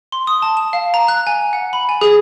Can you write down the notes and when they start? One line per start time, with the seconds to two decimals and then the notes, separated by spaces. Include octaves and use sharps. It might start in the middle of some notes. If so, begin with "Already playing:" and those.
0.12 C6
0.27 D#6
0.42 A5
0.57 E7
0.73 F5
0.94 A#5
1.08 F#6
1.27 G#5
1.53 F#5
1.73 B5
1.89 G#5
2.01 G#4